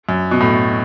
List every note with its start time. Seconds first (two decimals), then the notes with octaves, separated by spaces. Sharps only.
0.09 F#2
0.31 B2
0.40 A2